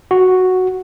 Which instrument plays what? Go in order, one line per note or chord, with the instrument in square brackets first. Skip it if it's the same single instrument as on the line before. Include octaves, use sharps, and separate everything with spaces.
[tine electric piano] F#4